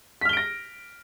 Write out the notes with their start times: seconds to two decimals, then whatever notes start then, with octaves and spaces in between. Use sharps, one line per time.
0.21 B6
0.25 F6
0.29 G7
0.33 D7
0.37 A#6